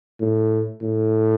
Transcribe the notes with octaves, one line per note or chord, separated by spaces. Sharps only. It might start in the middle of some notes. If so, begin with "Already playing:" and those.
A2
A2